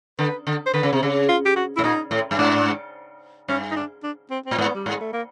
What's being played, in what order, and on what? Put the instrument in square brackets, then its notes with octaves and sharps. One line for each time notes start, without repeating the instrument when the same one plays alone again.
[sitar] D3 [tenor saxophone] B4
[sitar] D3
[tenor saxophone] C5
[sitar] D3 [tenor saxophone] B4
[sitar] C#3
C3
C#3
[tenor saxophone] F4
G4
F#4
[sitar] A2 [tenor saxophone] E4
[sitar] A#2 [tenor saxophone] D#4
[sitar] A2
G2
[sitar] G#2 [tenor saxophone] D4
[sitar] G2 [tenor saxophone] C#4
[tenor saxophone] D#4
D4
D4
C4
C4
[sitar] A2
[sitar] G#2 [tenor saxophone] B3
[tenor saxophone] G3
[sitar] G#2 [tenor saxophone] G#3
[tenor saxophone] A3
A#3